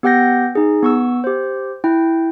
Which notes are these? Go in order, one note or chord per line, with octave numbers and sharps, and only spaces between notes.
B3 G4 F#5 G5 G6 A#6
D#4 G#4
B3 C#6 E6
G4 C5
E4 G5